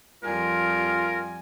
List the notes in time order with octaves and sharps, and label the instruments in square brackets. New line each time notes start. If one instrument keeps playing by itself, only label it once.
[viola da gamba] F2 F3 G3 [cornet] F4 [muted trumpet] A#4 [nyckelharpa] G#5